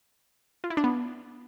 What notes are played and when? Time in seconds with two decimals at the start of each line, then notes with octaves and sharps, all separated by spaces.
0.64 F4
0.70 E4
0.77 D4
0.84 B3